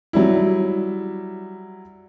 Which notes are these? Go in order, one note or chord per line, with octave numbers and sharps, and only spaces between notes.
F#3 G3 E4